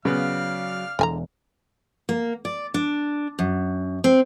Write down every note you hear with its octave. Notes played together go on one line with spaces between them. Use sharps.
C#3 F#3 B3 D5 F5 F6
E1 E2 D3 G#5 A#5
A#3
D5
D4
F#2
C4